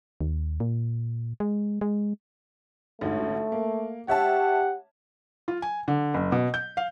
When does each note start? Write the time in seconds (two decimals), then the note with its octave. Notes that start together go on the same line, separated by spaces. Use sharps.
0.21 D#2
0.60 A#2
1.40 G#3
1.81 G#3
3.01 A1 D2 G#2 A3
3.52 A#3
4.08 G4 C#5 E5 F#5 A5
5.48 F4
5.62 G#5
5.88 D3
6.14 F#1
6.32 B2
6.54 G6
6.77 F5